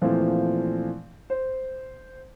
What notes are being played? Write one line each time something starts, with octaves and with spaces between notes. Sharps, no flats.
A#2 E3 F3 A3 C4
C5